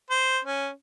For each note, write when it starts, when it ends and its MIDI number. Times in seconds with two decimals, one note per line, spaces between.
0.11 0.39 72
0.45 0.69 61